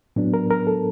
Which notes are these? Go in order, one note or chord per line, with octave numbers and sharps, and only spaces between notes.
A2 F#3 B3 D4
A#4
A#4
A4